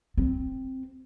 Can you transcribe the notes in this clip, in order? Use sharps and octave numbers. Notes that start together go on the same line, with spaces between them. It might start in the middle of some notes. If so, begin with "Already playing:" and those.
C4